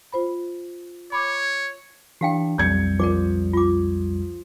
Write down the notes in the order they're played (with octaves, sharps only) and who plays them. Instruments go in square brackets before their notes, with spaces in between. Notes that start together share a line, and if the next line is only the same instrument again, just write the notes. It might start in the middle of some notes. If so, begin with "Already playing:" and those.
[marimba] F4 C5 B5
[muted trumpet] C#5 [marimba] B5 D6
[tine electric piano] E3 D4 [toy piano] G4 F5 G5
[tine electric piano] B1 F2 G3 [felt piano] G6 G#6 C#7
[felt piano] F3 [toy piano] A#4 D5 D6
[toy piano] F4 D6